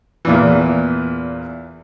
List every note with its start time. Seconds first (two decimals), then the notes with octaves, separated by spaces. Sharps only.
0.25 E2 A#2 E3